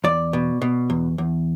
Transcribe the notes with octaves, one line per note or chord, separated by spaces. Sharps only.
E2 D5
B2
B2
E2
E2